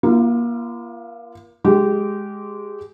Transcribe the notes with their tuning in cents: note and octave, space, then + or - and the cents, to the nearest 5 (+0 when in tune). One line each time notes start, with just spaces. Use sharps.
A#3 +30 F4 -35
G#3 +0 G4 -20